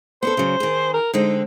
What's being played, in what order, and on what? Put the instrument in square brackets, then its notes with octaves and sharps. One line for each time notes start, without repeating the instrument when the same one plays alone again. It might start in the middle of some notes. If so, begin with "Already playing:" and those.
[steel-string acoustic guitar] B3 D4 A4 [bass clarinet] C5
[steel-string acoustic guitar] C#3 F#3
D#3 G#4
[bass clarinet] A#4
[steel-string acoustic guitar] D3 G#3 C4 [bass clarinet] D#4